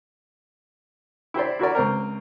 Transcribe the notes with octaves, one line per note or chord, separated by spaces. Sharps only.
E4 G4 C5 D5
E4 F#4 A#4 D5
C#2 C4 A#4